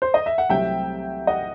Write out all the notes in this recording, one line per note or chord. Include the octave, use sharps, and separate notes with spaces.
C5
D#5
E5
F#5
C2 C3 F#3 A3 C4 E5 G5
D#5 F#5